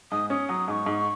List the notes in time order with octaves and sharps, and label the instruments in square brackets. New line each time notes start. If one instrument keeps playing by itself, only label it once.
[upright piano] G#2 [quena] D#6
[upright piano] C#4 [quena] D#6
[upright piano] F#3 [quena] D#6
[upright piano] G#2 [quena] C#6 D#6
[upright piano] G#2